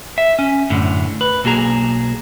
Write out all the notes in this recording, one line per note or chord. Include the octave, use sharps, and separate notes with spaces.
E5
C#4
F#2 A2 D3
B4
B1 A#3 F#4 G#4 A#5